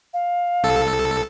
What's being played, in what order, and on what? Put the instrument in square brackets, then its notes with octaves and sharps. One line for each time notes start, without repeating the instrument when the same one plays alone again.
[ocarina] F5
[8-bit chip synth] C2 A4